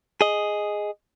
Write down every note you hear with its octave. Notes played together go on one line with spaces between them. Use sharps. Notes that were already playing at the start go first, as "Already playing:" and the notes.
G#4 D#5